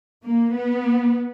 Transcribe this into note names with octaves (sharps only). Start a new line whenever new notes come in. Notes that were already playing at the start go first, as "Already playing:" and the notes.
A#3
B3